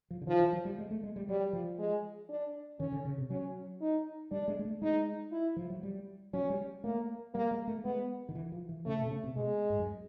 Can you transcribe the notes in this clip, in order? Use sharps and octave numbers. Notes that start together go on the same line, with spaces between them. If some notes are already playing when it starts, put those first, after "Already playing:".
F3
D3
D#3 F3
E3
F#3
G3
G#3
A3
G#3
G3
F#3 G3
F3
G#3
D4
D#3 C#4
D3
C#3
C3
F#3 C#4
D#4
G3 D4
G#3
G#3
A3
G#3 D#4
E4
F3
F#3
G3
F#3 C#4
G3
A3 A#3
G3 A#3
G#3
A3
G#3 B3
D#3
E3
F3
E3
C#3 A3
B2
C3
C#3
C3
B2 G#3
G#2
F#2